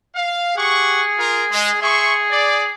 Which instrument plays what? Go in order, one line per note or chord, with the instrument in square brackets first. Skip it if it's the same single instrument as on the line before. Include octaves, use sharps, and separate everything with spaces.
[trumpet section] F5
[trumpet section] G4 F#5 C#6 [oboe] G#4
[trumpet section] F4 A#4
G#3
[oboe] G#4 [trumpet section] E5 C6 C#6
[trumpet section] D5